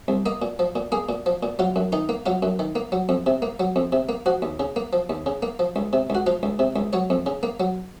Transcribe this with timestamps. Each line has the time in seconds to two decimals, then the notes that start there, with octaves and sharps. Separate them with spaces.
0.08 C2
0.26 A#3 D#5
0.42 A#2
0.59 F3
0.75 A#2
0.92 A#3 G#4
1.09 A#2
1.26 F3
1.43 A#2
1.59 F#3 F4
1.76 F#2
1.92 D#3 D#4
2.09 A#3
2.26 F#3 F4
2.43 F#2
2.59 D#3
2.75 A#3
2.92 F#3
3.09 F2
3.26 C3
3.42 A#3
3.60 F#3
3.76 F2
3.92 C3
4.09 A#3
4.26 F3 F#4
4.42 D#2
4.59 C#3
4.76 A#3
4.93 F3
5.10 D#2
5.26 C#3
5.42 A#3
5.59 F3
5.76 C#2
5.93 C3
6.10 C#2 F#4
6.26 F3 F4
6.43 C#2
6.59 C3
6.76 C#2
6.93 F#3 C#5
7.10 F2
7.26 C#3
7.43 A#3
7.60 F#3